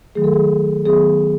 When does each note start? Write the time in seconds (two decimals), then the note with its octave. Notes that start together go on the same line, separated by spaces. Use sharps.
0.15 D#3 F#3 A3 G#4
0.24 A4
0.34 G#4
0.86 D#3 F#3 B3 G#4